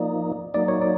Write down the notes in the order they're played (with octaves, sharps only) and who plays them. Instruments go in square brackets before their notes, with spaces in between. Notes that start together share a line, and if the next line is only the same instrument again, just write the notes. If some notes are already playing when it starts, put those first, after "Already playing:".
Already playing: [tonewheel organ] F3 A#3 D#4 [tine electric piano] D5
[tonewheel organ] F#3 A#3 D#4 [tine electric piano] D5
[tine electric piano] C#5
D5